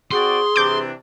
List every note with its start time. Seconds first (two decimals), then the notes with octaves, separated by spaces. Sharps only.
0.11 C4 F#4 G#4 D5 C6
0.56 C3 E3 D4 D6 G6